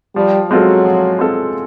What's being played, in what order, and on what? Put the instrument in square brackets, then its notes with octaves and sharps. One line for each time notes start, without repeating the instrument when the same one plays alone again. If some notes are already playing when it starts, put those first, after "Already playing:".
[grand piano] F3 [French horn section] G3
[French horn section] F#3 [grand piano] G#3 C4 F4 A4
[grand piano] F3
G#3 C4 F4 A4